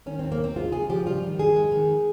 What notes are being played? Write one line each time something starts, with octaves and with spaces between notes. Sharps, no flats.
D#3 C#4
C4
D#2
A#3
D#2 C4
G#3 F4
C#3 G#4
F3 G4
G3 F4
D#3
F2 G#4
G#3
D#3